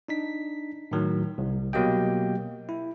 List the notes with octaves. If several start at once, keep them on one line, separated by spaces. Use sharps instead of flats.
D4 D#4 B6
A2 D#3 F#3
C2
B2 F#3 A#3 G4 D#5 G5
E4